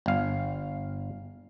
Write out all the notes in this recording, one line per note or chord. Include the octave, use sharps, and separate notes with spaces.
G1 F5